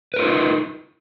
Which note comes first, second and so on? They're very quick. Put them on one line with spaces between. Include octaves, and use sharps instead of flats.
B4 A#4 F4 D#4